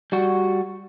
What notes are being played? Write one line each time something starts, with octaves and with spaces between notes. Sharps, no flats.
G3 F#4